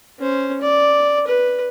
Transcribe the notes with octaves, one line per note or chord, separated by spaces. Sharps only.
C#4 C5
D5
B4